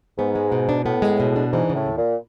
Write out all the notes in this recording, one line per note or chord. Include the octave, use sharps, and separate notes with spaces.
G#2 B3
G#3
B2
D4
A2 B3
G#3
B2
D4
G#2 E3
C#3
A2
D#2
A#2